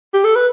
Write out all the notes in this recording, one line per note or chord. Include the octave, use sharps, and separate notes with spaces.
G4
A4
B4